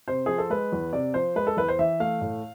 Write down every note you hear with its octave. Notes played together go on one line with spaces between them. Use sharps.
C3 C5
F3 G#4
A4
G#3 B4
E2
C3 D5
F3 C5
G#3 B4
A4
E2 B4
C5
E3 E5
A3 F5
A2